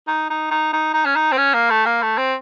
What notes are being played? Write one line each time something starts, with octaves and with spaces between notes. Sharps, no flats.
D#4
D#4
D#4
D#4
D#4
C#4
D#4
C4
C#4
A#3
A3
A#3
A3
C4